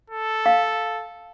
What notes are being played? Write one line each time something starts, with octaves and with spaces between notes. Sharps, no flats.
A4
F5